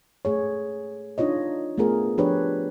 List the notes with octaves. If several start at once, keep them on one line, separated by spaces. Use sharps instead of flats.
A3 G#4 C#5
D4 D#4 F4 C#5 D#5
A3 B3 F4 G#4 A#4
F3 D4 G4 B4 C#5